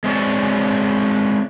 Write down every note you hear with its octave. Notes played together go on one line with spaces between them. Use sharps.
G#3 C4 C#5 D5